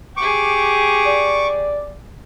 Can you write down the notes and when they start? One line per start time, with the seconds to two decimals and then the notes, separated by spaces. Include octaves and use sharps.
0.17 G4 G#4 C#6 D6
1.06 D5